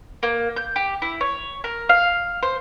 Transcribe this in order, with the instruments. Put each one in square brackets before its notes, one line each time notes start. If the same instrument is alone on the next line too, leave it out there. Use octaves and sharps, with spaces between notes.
[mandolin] A#3
G6
G4
E4
C#5
A#4
F5
C5